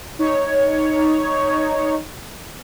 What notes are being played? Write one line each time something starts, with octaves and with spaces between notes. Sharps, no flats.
D#4 C#5